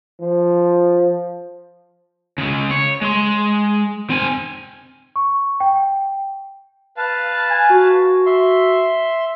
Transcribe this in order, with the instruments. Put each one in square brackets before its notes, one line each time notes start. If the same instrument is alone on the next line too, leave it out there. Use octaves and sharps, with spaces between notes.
[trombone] F3
[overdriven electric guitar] C#3 G#3
C#5
G#3 C6
C4 G#5
[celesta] C#6
G5
[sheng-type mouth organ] B4 F5 A5
[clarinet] G#5
F#4
[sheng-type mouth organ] E5 C6